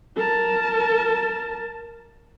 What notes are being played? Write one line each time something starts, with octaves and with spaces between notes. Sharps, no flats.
A#4 A5